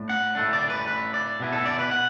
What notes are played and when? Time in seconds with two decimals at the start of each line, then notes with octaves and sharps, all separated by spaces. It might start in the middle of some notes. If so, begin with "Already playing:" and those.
Already playing: A2 A3 D4
0.09 F#5
0.35 A2 A3 D4
0.53 D5
0.70 B4
0.87 B4
1.14 D5
1.40 B2 B3 E4
1.52 A4
1.66 D5
1.79 B4
1.91 F#5